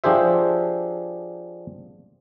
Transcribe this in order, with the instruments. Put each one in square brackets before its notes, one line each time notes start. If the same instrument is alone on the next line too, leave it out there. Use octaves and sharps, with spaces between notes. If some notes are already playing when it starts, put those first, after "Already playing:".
[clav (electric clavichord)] F3 D4 G4 G#4 C5 E5